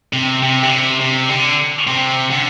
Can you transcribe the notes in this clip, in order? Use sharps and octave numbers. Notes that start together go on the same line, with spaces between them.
C3
C3
D3
C3
C3
D3
C3
D3